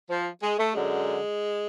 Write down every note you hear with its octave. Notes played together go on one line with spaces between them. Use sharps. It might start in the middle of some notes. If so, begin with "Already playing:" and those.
F3
G#3
A3
F#2 D3 G#3